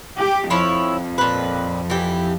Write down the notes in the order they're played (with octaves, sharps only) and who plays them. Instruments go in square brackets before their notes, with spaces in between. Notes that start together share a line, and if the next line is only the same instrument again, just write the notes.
[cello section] G4
[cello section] F2 [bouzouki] F3 E4 C#5
[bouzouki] A#2 B4
E3 G4